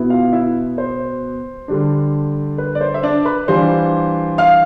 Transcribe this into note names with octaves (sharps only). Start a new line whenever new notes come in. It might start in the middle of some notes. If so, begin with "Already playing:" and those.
Already playing: B2 B3 E4
F4 F5
E4 E5
C5
D3 G3 D4
B4
D5
C5
E5
D4 D5
B4 B5
E3 G3 D4 F4 C5 C6
F5 F6